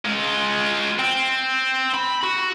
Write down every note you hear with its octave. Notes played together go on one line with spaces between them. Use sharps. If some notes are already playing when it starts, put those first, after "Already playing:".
G#3 F4
C4
B5
F#4